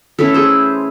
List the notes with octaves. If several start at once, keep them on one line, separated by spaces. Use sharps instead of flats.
E3 A3 C#4 E4 A4 C#5
G#4 C5